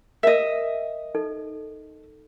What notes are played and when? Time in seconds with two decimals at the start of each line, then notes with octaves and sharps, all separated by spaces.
0.23 A#4 D#5 E5
1.15 D#4 A4